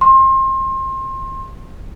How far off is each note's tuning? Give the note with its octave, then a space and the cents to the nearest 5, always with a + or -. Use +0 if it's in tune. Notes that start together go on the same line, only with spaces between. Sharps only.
C6 +30